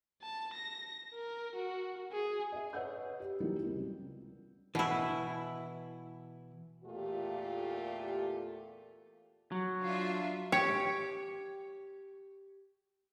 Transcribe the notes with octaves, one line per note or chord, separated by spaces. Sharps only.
A5
A#6
A#4
F#4
G#4
D#5 E5
B4 C#5 D#5 F#5 E6 G6
G4
E3 F#3 G3 A#3 D#4 E4
C#2 C3 G3
B2 E3 E4
E2 A#2 A3 F4 G4
F#3
D4 F4 E5
G4 C#5